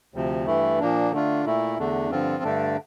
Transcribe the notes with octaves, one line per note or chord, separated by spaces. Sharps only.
D2 C3 F3
G2 E3 A3 E4
A#2 F3 A#3 D4
D3 A3 D4 F4
A#2 A3 E4
E2 D3 A3 D4
G2 D3 F3 C4 F4
G2 D3 A3 D4